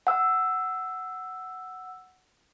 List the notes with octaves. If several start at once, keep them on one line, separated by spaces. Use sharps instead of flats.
F#5 E6